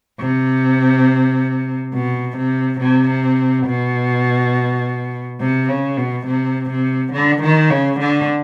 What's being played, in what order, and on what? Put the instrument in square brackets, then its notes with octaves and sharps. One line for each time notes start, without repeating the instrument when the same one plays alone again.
[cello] C3
B2
C3
C3
B2
C3
C#3
B2
C3
C3
D3
D#3
C#3
D3